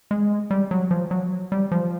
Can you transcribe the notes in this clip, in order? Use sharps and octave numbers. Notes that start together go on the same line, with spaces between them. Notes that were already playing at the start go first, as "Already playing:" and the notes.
G#3
G3
F#3
F3
F#3
G3
F3